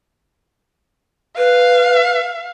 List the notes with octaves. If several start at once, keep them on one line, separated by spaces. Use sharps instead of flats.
B4 F5